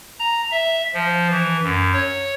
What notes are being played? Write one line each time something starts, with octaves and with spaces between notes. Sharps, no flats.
A#5
E5
F3
E3
F#2
C#5